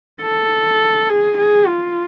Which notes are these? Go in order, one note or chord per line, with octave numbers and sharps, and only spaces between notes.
A4
G#4
G#4
F4